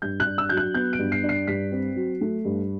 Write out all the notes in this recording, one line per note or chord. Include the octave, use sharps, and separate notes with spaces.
G2 G6
F#6
D4
E6
F#3 G6
F#6
B3 G6
D7
G2
C7
D4
C7
G2 B6
C4
F#3
A3
G2